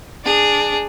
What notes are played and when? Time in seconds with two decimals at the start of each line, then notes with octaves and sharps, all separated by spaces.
0.25 D4 G#4